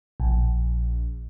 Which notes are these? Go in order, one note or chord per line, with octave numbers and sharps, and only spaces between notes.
A#1